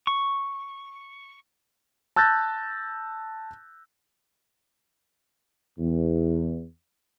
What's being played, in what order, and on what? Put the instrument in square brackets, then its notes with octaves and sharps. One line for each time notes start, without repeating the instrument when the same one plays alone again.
[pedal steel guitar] C#6
[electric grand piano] A5 E6 F#6 G6 A6 A#6
[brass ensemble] E2